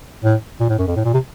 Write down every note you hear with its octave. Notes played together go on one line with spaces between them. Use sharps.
A2
A#2
A2
F#2
F2
A2
A#2
C3